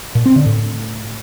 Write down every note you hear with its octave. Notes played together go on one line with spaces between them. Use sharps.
A#2
C4
D3
A2